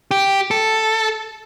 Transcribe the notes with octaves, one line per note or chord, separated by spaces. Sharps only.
G4
A4